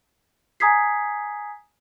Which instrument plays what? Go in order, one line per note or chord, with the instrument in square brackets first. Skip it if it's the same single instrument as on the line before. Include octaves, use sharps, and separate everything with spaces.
[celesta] G#5 A#5 D#6 G#6 B6 C7